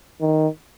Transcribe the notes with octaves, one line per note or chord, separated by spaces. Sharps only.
D#3